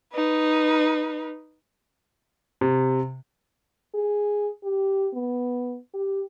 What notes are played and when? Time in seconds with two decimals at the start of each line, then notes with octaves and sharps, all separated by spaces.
0.14 D#4 B4
2.61 C3
3.95 G#4
4.63 G4
5.14 B3
5.94 G4